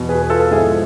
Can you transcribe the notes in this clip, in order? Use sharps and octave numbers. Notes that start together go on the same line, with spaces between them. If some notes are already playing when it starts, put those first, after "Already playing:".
Already playing: E2 B2
G#4 B4
B4
F4 A4
G#2 F3 E4 G#4